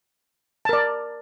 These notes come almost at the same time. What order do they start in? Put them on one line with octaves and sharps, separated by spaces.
A5 A#4 D5